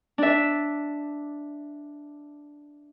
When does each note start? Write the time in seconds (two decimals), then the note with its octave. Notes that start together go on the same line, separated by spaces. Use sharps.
0.18 D4 E5